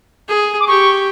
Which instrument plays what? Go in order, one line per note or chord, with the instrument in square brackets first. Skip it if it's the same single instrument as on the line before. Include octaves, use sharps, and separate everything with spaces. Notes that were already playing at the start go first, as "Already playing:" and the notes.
[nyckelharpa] G#4
[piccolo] D6
[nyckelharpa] G4 [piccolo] C#6